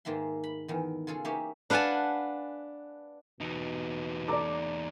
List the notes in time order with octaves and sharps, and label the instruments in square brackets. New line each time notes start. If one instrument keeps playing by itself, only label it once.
[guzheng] G#2 D#3 A#3 E5 C6
B5
E2 D#3
C#3 F4 G#4 A4
A#3 C#4 D#4 G4 C#5 E5
D4 B4 F5 F#5 G#5 A5
[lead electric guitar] E2 D#4 [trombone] B2
[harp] A4 D5 [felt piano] A#5 D6